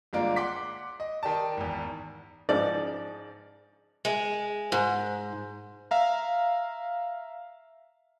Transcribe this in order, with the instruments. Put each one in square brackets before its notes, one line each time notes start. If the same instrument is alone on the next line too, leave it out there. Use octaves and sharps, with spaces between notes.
[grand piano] G1 G#3 A#3 D4 F4 A#4
F#5 C6 D6 B6
D#5
D#3 G4 D5 A5
G#1 E2
[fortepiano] G#2 F3 D#4 D5
[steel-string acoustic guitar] G#3
G#2
[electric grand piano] E5 F5 A#5